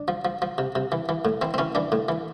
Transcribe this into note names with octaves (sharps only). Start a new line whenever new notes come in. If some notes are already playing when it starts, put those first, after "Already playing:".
Already playing: D4
F3
F3
F3
C3
C3
E3
E3
A2
E3 C4
C4
E3 C#4
E3 D4
A2
E3